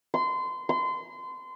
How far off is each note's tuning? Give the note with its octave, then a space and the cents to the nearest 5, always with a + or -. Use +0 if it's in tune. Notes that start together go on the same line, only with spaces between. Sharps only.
C6 -25
C6 -30